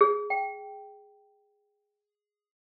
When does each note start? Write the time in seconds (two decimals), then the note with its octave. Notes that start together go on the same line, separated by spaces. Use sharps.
0.01 G#4
0.30 G5